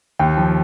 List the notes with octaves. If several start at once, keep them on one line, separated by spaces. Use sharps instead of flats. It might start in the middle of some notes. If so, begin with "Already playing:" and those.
D#2 G5
F3